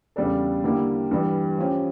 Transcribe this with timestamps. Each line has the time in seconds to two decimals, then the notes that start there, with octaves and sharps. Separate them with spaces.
0.16 E2 C#3 G3 D4 A4
0.64 D3 G3 A#3 E4 G4
1.11 G2 E3 G3
1.58 F3 C#4 G4